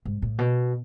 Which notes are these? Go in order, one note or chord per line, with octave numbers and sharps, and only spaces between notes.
G#2
A2
B2